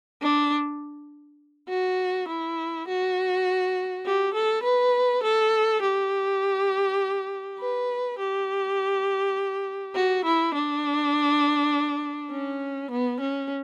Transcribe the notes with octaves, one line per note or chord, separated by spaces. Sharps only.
D4
F#4
E4
F#4
G4
A4
B4
A4
G4
B4
G4
F#4
E4
D4
C#4
B3
C#4